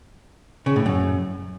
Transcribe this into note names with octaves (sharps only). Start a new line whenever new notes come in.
C#3
A2
F#2